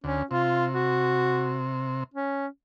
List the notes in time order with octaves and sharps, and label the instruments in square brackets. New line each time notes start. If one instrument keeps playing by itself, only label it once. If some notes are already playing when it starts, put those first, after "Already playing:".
[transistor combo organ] D2 [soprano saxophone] C#4
[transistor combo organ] C3 [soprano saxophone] F4
[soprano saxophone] F#4
C#4